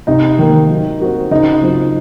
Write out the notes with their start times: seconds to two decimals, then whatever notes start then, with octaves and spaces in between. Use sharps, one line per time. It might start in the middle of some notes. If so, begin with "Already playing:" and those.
0.07 C3 D#4
0.39 D#3 A#3
0.69 F#3
1.00 C4 F#4 A#4
1.31 C#3 D#4
1.62 F#3 C4 F4